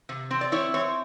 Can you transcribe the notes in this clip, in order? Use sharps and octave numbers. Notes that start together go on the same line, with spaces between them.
C3
C4
D5
E4 C#5
C4 C#5